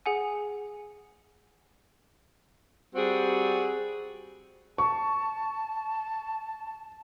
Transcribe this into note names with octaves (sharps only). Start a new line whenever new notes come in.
G#4 F#5 G#5
G3 C4 F#4 G#4
A5 C#6